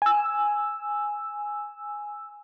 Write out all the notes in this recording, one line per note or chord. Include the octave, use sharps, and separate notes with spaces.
G#5 E6